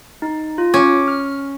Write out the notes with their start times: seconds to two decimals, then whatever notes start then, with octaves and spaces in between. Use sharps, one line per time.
0.22 D#4
0.58 F4
0.74 C#4 D6
1.08 F6